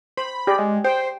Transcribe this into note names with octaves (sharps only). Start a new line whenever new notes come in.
C5 B5
G4 G#4 D5
G#3
C5 G5